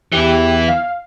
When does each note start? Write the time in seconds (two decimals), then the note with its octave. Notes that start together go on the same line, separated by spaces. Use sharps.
0.12 E2 E3 E4 G4
0.68 F5